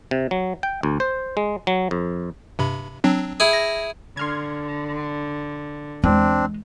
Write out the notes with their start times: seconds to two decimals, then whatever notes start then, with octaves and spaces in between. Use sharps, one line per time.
0.11 C3
0.31 F#3
0.63 G5
0.83 D2
1.00 C5
1.37 G#3
1.67 F#3
1.91 F2
2.59 G2 C3 B5
3.04 F#3 C4 D4
3.40 E4 G#4
3.53 A#6
4.17 D3 C6 F6 G#6
6.04 E2 G#3 C4 D4